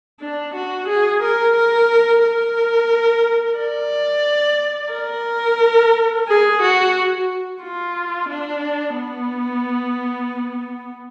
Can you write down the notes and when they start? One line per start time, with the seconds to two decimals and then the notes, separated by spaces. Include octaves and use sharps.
0.21 D4
0.54 F#4
0.88 G#4
1.22 A#4
1.56 A#4
2.24 A#4
3.58 D5
4.93 A#4
6.28 G#4
6.62 F#4
7.63 F4
8.30 D4
8.97 B3